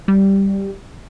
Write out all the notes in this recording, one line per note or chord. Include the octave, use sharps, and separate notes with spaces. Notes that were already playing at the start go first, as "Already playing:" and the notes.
G3